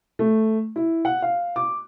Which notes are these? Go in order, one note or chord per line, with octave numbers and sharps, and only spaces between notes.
A3
E4
F#5
F5
D6